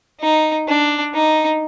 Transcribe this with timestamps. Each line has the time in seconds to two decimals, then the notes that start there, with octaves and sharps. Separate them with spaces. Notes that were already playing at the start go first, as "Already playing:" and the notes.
0.21 D#4
0.68 D4
1.14 D#4